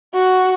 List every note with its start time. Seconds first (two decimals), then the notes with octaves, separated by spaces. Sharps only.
0.14 F#4